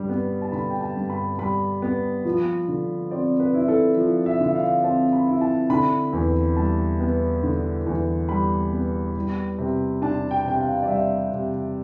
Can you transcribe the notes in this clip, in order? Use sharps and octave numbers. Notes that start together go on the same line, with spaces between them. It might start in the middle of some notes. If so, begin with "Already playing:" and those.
Already playing: G2 D3 G3
B3
A5
D3 B5
G5
A5
G2
B5
G3 B5
B3
F3
D3
C4 D5
B4
E4
A4
F3
E5
D3 E5
F5
C4 A5
B5
E4
A5
D3 B5
E2
G3 A5
B3
D3
E2
G3 B5
B3
G3
C3
D4 A5
G5
C3 G5
F5
D5
G3 E5
C3